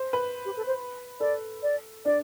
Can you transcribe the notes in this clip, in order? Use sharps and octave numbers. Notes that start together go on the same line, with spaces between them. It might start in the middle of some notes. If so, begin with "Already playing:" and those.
Already playing: C5
B4
G4
A4
C5
A4 D5
D5
D4 D5